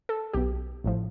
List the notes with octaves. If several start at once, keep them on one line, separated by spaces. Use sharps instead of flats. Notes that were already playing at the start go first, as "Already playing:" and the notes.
A4
B1 B2 G4
A1 A2 F3